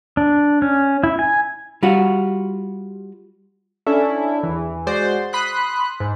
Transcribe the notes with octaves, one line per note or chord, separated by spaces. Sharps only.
D4
C#4
E4
G#5
G3 F4 F#4
C#4 D4 E4 A4
E2 E3
G#3 F#4 C5 D5
B5 C6 D#6 F#6
G#2